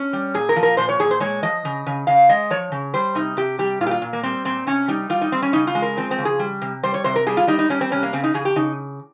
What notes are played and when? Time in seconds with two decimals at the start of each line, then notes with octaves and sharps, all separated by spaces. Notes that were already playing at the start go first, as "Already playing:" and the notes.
Already playing: C#4
0.13 G3
0.34 A#2 G#4
0.49 A#4
0.56 F3
0.63 A#4
0.77 A#2 C5
0.89 C#5
0.99 A#2 G#4
1.11 C5
1.20 G#3 C#5
1.43 F3 D#5
1.65 C#3
1.86 C#3
2.07 C#3 F5
2.29 G#3 D#5
2.50 F3 C#5
2.72 C#3
2.94 G3 C5
3.15 C3 D#4
3.37 C3 G4
3.59 G3 G4
3.81 A#2 F4
3.86 G4
3.91 F4
4.02 A#2
4.13 A#3
4.23 G3 C4
4.45 A#2 C4
4.67 C3 C#4
4.88 G3 D#4
5.10 G3 F4
5.21 D#4
5.32 G3 C4
5.42 C#4
5.53 C#3 D#4
5.67 F4
5.75 G#3
5.82 A#4
5.97 F3 C4
6.11 C4
6.18 C#3
6.25 G#4
6.39 G3
6.62 C3
6.83 G3 C5
6.94 C#5
7.04 C3 C5
7.16 A#4
7.26 G3 G#4
7.37 F4
7.47 G3 D#4
7.59 D#4
7.69 G3 C#4
7.81 C4
7.91 C3 C#4
8.03 A#3
8.13 C#3 C4
8.24 D#4
8.34 C#3 G#4
8.45 G4
8.56 C#3 D#4